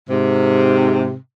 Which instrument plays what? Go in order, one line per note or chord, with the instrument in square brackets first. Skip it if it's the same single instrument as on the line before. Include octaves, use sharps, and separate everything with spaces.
[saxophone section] G#2 C3